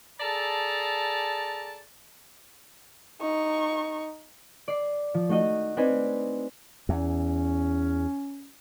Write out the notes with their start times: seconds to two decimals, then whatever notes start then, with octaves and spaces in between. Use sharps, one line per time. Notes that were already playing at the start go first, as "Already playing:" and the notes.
0.20 G#4 A4 D5 A5 A#5
3.21 D#4 C#6
4.68 D5 C7
5.14 F3
5.29 A3 D#4 F#4 D#5
5.77 C4 D4 D#4 B4 G#5
6.89 E2 C#4